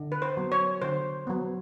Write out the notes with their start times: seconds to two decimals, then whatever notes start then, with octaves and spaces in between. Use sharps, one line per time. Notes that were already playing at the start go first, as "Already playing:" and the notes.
Already playing: D3
0.12 B4
0.22 C5
0.37 F#3 B3
0.52 C#5
0.82 D3 C5
1.27 F#3 B3